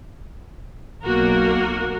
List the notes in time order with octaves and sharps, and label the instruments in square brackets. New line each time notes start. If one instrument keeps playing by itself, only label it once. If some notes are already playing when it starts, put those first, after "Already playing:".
[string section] B1 [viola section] A#3 F#4 A#4